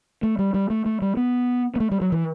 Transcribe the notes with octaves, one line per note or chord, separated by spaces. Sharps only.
A3
G3
G3
A3
A3
G3
B3
B3
A3
G3
F#3
E3